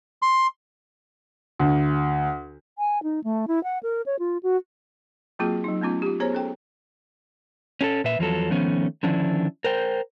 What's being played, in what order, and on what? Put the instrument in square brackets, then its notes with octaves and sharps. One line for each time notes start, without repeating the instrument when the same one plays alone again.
[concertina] C6
[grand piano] D2
[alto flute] G#5
D#4
A3
E4
F#5
A#4
C#5
F4
F#4
[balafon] F#3 A#3 C4 F4 F#4 G#4
F#3 D#4
A3 B3 C#4 F4
F4 G4
B3 G#4 C5 C#5 A#5
C#4 A4 G5
[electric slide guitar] C#4 G#4 A4
A#2 B4 E5
E2 F3 F#3 A4
D#3 F3 A3 B3 C#4
D3 D#3 F3 C#4 D4 E4
A#4 C5 G5